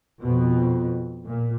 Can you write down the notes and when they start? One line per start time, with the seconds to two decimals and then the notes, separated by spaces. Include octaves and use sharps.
0.21 F2 B2
1.25 A#2